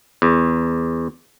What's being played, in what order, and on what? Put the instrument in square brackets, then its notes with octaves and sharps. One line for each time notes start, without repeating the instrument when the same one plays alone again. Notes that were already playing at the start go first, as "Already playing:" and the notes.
[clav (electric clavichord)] E2